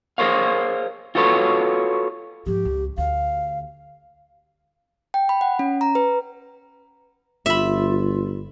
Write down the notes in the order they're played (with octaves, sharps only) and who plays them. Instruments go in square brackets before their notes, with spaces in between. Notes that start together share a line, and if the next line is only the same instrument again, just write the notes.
[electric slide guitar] G#4 A#4 C5 C#5 F5
F4 F#4 A4 B4 C#5
[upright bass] G#2 F3 [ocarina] G4
[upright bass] C#2
[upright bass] D2 [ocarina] F5
[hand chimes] G5
B5
F#5
C#4
A#5
B4
[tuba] G1 [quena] F4 [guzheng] E5 B5